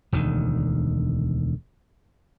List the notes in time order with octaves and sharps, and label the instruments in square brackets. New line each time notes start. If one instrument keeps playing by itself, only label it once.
[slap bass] E1 D2 D#3